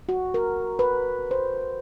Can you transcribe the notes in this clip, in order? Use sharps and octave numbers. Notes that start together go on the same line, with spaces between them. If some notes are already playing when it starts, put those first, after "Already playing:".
F#4
A#4
B4
C5